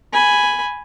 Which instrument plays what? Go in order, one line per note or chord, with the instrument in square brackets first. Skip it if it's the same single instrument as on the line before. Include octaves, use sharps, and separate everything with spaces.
[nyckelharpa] G#5 B5